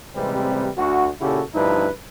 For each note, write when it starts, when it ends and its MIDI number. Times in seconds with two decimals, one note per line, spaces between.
0.15 0.68 33
0.15 0.68 48
0.15 0.68 55
0.15 0.68 56
0.15 0.68 60
0.15 0.68 71
0.77 1.09 38
0.77 1.09 66
1.21 1.41 46
1.21 1.41 49
1.21 1.41 64
1.21 1.41 66
1.21 1.41 67
1.21 1.41 69
1.54 1.88 38
1.54 1.88 43
1.54 1.88 53
1.54 1.88 63
1.54 1.88 64
1.54 1.88 71